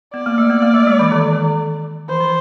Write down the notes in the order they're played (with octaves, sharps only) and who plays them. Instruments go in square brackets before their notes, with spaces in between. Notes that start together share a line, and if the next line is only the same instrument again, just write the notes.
[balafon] B3 [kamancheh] D5
[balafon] A#3
A3
B3
A#3
A3
G#3
E3
D#3
D#3
[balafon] E3 [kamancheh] C5
[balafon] F3